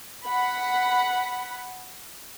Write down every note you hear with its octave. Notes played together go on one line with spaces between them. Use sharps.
F#5 B5